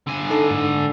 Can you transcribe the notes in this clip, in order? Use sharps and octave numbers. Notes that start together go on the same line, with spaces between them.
D3 G#5
D#4 A4 A5
G#2